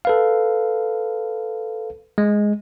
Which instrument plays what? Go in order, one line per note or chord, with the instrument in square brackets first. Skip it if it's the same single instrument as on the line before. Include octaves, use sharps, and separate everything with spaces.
[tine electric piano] A4 B4 F5
G#3